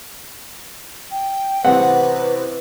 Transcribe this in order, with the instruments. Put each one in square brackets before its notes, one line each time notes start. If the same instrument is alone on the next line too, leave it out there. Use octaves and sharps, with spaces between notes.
[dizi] G5
[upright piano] A1 C3 C4 [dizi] B4 [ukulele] F#5